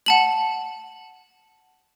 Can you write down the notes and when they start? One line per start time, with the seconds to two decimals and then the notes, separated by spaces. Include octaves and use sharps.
0.06 F#5 A5 F#7